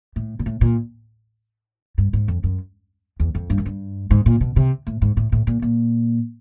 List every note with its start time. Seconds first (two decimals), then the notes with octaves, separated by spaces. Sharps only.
0.16 A2
0.39 A#2
0.46 A2
0.61 A#2
1.98 G2
2.13 G#2
2.28 F2
2.44 F#2
3.20 E2
3.35 F2
3.50 G2
3.58 F#2
3.66 G2
4.11 G#2
4.26 A#2
4.41 B2
4.56 C3
4.87 A2
5.02 G#2
5.17 A2
5.32 A2
5.47 A#2
5.62 A#2